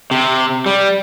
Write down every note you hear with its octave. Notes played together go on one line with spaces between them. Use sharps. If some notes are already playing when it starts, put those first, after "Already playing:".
C3
G3